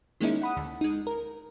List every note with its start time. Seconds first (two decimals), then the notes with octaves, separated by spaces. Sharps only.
0.20 D#3 G#3 A#3 C#4 D#4 E4
0.42 F#5 B5 D#6
0.57 D2
0.81 G#3 D#4
1.07 A#4